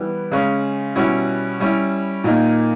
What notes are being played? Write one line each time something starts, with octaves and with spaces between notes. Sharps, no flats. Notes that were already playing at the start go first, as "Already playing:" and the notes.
Already playing: E3 G3 B3 E4
C#3 G#3 C#4
B2 G3 C#4 E4
G3 C#4 E4
A#2 A#3 D#4